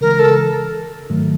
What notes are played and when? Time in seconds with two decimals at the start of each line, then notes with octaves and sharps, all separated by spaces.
0.01 C#3 E3 G#3 A#4
0.19 A4
1.10 G#2 D#3 F#3 A3